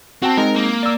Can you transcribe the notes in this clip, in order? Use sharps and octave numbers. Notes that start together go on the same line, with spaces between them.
C4 F#4 G5 A5
G#3 C4 D#4 A#4
A#3
D5 E6